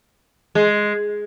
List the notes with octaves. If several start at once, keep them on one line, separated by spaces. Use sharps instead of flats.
G#3